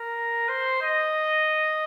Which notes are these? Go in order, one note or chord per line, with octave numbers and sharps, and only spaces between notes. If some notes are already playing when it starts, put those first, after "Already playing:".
Already playing: A#4
C5
D#5